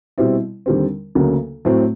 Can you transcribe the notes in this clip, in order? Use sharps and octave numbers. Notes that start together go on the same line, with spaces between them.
B2 G3 C4 E4
D#2 D3 G3 C4
D2 C#3 F#3 A#3
A2 F#3 A3 C4